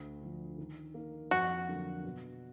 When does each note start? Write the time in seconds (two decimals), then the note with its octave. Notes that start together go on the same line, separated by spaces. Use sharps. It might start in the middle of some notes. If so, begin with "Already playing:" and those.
Already playing: D2
0.21 D3 F3
0.58 D#3
0.94 A#3 D#4
1.31 F2 F#4
1.68 D3 F#3 A#3
2.04 B2